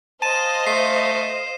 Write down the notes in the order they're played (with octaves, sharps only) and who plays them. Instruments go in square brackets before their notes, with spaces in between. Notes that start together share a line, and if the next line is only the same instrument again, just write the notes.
[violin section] C5 D#5 F5 [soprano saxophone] A5 [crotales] D#7 E7
[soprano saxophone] A3 [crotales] C7